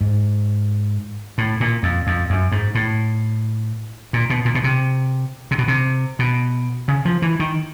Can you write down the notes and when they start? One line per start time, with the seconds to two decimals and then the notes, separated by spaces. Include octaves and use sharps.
0.01 G#2
1.38 A2
1.60 A#2
1.83 F2
2.07 F2
2.30 F#2
2.52 G#2
2.75 A2
4.13 A#2
4.30 B2
4.45 A#2
4.55 B2
4.64 C3
5.51 C3
5.58 B2
5.68 C3
6.19 B2
6.88 C#3
7.05 F3
7.22 E3
7.40 D#3